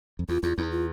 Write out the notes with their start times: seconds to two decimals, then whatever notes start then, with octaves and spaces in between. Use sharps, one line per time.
0.19 F2
0.29 E2 F4
0.43 E2 F4
0.57 E2 E4
0.71 F4